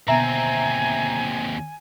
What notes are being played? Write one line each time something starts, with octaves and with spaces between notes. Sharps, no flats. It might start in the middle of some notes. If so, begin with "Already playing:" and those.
D#2 B2 D3 B3 C4 E5 G#5 A#5